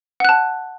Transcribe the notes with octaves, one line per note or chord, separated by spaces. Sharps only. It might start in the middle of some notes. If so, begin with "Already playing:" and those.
F#5 A5 F#6